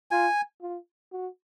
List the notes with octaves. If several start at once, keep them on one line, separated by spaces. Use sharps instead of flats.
F4 G#5
F4
F#4